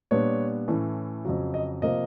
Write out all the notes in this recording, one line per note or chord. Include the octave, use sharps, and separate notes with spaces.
A#2 G3 B3 D4 C#5
A2 E3 A3 C#4
F2 C#3 F#3
D#5
C3 F3 A#3 D#5